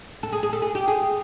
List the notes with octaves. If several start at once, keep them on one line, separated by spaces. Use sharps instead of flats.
A4
G#4
G#4
A4
G#4
G4
G#4